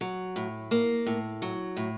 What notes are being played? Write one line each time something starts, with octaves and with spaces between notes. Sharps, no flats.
F#3
A2
A#3
A2
F#3
A2